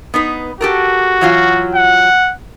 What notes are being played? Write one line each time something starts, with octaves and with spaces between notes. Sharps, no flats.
B3 D#4 B4
F#4 G4 A4 A#4
E3 F#3 F4
F#5